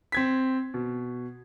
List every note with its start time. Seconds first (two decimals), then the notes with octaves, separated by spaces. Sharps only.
0.12 C4 G#6 B6
0.74 B2